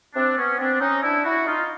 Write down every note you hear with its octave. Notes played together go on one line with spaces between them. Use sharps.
C4 D4
B3 C#4
C4 D4
C#4 D#4
D4 E4
E4 F#4
D#4 F4